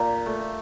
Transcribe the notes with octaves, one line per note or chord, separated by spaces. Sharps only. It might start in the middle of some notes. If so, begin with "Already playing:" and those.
Already playing: A#2 G4
A3